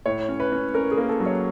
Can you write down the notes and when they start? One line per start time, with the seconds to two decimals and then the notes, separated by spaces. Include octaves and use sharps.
0.06 A2 C#5
0.29 C#4
0.40 B4
0.52 C#4
0.74 C#4 A#4
0.91 G#4
0.97 A#3
1.09 A4
1.20 F#3
1.26 C#5